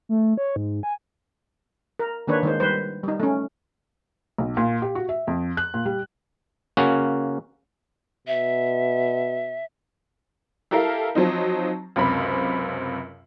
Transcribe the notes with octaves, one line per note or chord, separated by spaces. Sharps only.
A3
C#5
G#2
G#5
A#4
D#3 A#3 D4 B4 C#5
D#3 G#3 C5
G3 B4 C5
G3 D#4
A3 C#4
B1
A#2
G4
F#4
E5
F2
F#6
A#2
G3
C#3 A#3 C#4 F#4
B2 E5
E4 G4 A4 A#4 E5 F5
F3 F#3 C4 D#4
C#2 F#2 C3 C4 B5